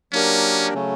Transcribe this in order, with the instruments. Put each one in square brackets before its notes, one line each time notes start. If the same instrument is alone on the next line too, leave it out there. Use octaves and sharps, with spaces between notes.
[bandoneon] F#3 A#3 D4 G4 A#4 [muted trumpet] C#4
[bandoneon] C#3 F#3 A3 C#4